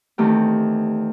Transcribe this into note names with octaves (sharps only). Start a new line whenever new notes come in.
E2 D#3 A3 C4 G4